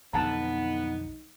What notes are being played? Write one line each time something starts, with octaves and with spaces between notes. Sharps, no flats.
B1 F2 D3 B3 D#4 A5 A#5